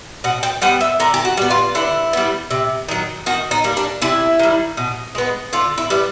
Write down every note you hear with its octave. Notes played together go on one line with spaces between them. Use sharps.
B2 F#5
G5
G3 B3 F#5
E5
D3 A#4
G4
F#4
G3 B3
F4
D3 E4
G3 B3
C3
D#3 F#3
D#3 F#4
D#4
G3 A#3
D4
C3 E4
D#3 G3
B2
G#3 B3
D3 F4
E4
G3 B3